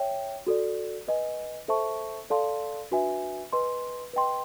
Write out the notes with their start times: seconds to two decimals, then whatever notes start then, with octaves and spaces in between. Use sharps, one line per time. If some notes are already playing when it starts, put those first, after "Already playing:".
Already playing: C#5 E5 G5
0.47 F#4 A4 D5
1.08 B4 D#5 G#5
1.68 A4 C5 E5 A5 C#6
2.30 A4 D5 F5 A5 C6
2.91 D4 F#4 B4 E5 G#5
3.53 B4 D#5 G#5 C6
4.14 B4 D#5 G5 C6